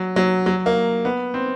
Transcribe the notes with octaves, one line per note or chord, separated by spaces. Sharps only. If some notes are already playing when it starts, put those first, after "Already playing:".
Already playing: F#3
F#3
F#3
A#3
B3
C4